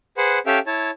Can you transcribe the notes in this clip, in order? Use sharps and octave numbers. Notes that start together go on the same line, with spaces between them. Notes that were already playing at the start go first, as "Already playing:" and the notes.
G#4 B4 C5 F#5
C#4 G4 A4 E5 F5 G5
E4 C#5 A5